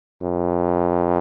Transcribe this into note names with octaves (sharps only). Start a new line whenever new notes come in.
F2